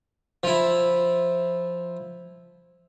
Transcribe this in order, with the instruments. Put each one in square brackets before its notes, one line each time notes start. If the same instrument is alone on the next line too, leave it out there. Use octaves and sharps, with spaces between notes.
[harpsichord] F3 E4